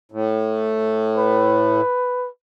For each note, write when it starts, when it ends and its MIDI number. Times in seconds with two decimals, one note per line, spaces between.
0.12 1.81 45
1.16 2.28 71